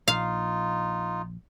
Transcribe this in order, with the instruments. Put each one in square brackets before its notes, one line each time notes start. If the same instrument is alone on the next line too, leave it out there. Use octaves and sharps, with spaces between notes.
[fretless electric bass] A#1 [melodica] D#4 F4 [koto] F5